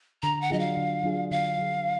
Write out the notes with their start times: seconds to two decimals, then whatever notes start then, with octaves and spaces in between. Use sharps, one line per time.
0.22 D3 A#5
0.41 F#5
0.50 F#3 D4 F4 G#4 D#5
0.59 F5
0.77 D3
1.04 F#3 D4 F4 G#4
1.31 D3 F5
1.58 F#3 D4 F4 G#4